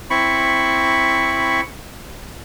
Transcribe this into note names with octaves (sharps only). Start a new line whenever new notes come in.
C4 E4 B5 C#6